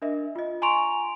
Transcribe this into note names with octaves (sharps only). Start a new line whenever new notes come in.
D4 A#4 D#5 E5
F4 D#5
G#5 A#5 C6 C#6 D7 F7